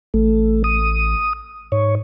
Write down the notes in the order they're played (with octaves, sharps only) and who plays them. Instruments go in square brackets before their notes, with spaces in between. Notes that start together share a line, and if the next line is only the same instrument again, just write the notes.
[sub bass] A1 [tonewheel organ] A3
[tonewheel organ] D#6
[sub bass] G#2 [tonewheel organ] C#5